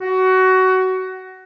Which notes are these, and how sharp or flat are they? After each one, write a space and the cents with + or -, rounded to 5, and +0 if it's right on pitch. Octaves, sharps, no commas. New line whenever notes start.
F#4 +20